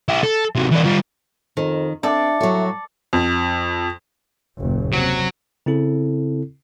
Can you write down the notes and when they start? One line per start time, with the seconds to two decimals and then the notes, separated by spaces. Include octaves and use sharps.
0.09 E4 G4
0.23 A4
0.56 C3 F#3
0.72 E3 D4
0.86 G3 F4
1.57 F2 D#3
2.03 C4 D4 A4 D5 E5
2.41 A2 F#3 F#4
3.13 F2
4.59 F#1 D#2 A#2
4.93 C3 F#3
5.66 C#3 C4 E4 A4